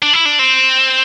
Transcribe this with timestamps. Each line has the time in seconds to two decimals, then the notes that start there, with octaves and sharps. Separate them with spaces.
0.02 D4
0.13 E4
0.25 D4
0.39 C4